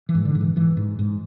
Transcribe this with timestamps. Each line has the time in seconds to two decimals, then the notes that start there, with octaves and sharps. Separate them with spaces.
0.09 E3
0.15 G#2
0.25 D3
0.35 G#2
0.40 E3
0.56 G#2 E3
0.77 G#2
0.99 G#2